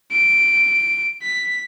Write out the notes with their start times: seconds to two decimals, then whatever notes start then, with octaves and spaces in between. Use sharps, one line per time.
0.11 D7
1.22 B6